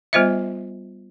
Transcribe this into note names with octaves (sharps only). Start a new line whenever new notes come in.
G3 B3 F4 C5 D#5 E5